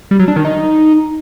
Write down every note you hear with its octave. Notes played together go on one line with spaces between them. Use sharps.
G3
F#3
D4
D#3
D#4